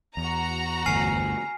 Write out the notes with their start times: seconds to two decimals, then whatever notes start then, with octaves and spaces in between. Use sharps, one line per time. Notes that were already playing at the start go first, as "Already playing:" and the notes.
0.17 E2 F#4 A#5
0.86 G1 D2 G#5 F6 C7